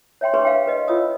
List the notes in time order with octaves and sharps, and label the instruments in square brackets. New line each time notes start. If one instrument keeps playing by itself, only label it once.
[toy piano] C#5 E5 G5 C6
D4 G#4 B4 C#5 C6 C#6
B4 F5 G5
B4 D#5
F4 C#5 D#5 D#6 E6